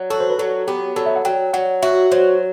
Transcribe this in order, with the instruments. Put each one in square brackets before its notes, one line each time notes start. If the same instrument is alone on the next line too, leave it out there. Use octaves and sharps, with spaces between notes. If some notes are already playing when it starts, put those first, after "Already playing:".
Already playing: [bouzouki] F#3
[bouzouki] F#4 [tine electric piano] A4
[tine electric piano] C5
B4
[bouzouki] F#3 [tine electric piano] A4
[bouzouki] B3 [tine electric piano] G4
[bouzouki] F#3 [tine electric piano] A4
[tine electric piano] E5
F#5
[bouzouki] F#3 [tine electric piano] G5
[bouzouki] F#3 [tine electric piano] F#5
[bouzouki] F#4 [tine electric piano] E5
[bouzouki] F#3 [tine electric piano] C5